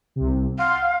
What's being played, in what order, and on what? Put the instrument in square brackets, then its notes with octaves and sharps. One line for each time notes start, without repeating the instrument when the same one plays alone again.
[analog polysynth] C2 C3
[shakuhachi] F5 [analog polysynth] F#5 C6